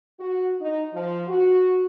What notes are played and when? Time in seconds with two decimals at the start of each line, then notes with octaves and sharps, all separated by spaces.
0.19 F#4
0.61 D#4
0.94 F3
1.28 F#4